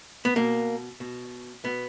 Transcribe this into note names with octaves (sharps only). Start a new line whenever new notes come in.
B3
B2 A#3
B2
B2 B3